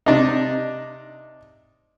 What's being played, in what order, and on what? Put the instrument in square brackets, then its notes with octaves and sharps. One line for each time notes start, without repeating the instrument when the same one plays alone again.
[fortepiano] C3 D4 D#4